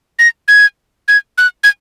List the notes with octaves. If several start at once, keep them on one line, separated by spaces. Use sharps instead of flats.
A#6
G#6
G#6
F#6
G#6